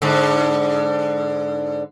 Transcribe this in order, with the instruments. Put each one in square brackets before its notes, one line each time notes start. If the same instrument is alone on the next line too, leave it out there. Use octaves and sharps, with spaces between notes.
[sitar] G#2 D3